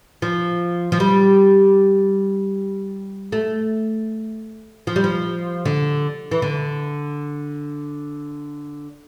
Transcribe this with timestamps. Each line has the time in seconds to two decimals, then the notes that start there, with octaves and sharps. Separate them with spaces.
0.22 F3
0.92 F3
1.00 G3
3.32 A3
4.87 F3
4.96 G3
5.04 F3
5.65 D3
6.31 E3
6.42 D3